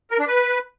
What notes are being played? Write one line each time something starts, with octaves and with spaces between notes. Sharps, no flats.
A#4
D4
B4